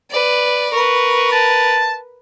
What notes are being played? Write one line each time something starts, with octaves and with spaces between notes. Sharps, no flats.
B4 D5
A#4 B4 C#6
A5